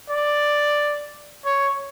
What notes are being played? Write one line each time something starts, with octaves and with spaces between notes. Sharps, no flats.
D5
C#5